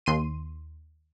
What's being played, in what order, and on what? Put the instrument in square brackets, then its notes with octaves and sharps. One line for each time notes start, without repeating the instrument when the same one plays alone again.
[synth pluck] D#2 C6 D#7